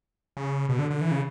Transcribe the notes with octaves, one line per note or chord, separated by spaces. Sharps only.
C#3
B2
D3
D3
E3
C#3